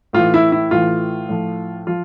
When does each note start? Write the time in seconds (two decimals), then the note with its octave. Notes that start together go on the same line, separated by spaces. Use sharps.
0.13 A2 E3 F4
0.34 E4
0.52 E4
0.71 A2 E3 F4
1.29 A2 F3
1.87 F3 F4